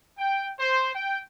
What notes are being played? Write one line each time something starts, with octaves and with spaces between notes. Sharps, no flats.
G5
C5
G5